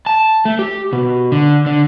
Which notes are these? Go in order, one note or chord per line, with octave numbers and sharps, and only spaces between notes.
A5
A3
G4
B2
D3
D3